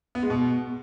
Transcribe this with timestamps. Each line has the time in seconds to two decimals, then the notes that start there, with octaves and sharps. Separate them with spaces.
0.15 B3
0.23 G#3
0.30 B2